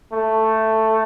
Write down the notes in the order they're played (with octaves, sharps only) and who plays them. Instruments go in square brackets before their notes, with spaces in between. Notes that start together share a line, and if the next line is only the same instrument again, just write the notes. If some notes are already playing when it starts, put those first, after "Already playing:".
[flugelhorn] A3